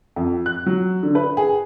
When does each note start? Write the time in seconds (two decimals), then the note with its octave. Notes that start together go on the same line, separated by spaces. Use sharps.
0.16 F2
0.46 F#6
0.66 F#3
1.03 D3
1.15 B4
1.37 G#4